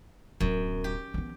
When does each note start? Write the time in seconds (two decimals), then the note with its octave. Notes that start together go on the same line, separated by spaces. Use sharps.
0.40 D1 F#2 B3
0.84 G4
1.14 E3 B3